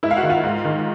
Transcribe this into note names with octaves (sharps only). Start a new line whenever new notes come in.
G#2 E4 E5
F5
F#4 F#5
D#3
F4 F5
G#2
D#3